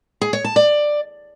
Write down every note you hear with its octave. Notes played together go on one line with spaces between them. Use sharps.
G#4
C#5
A5
D5